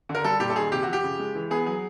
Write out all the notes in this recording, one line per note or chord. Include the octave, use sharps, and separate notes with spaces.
D3
A#4
G3 A4
A#2 G4
A4
D#3 G#4
C3 G4
F#4
F3 G4
C#3
G#3
E3
B3 G#4
F#3 G#4